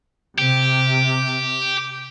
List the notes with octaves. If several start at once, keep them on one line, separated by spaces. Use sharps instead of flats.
C3 G4